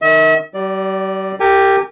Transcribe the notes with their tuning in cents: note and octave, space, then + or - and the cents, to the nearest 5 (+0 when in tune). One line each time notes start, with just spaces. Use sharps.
D#3 -15 E5 -40
G3 -40 D5 +0
G4 +0 A#4 -35 G#5 -30